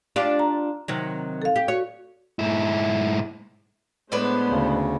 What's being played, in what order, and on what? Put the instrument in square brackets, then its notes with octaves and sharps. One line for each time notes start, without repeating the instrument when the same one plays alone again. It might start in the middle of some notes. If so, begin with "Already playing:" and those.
[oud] D4 F4 G4
[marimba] A#5
[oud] C3 D#3 F#3
[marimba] A4 F5
[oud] G4
[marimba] F#4 [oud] C#5
[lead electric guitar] G#2 E4
[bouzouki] A2 D4 B4 [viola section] G#3 B3 C5
[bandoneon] D2 C#3